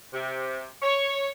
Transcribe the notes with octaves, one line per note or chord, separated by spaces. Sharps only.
C3
C#5